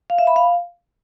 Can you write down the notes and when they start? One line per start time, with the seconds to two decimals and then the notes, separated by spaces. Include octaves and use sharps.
0.10 F5
0.18 E5
0.27 B5
0.36 F5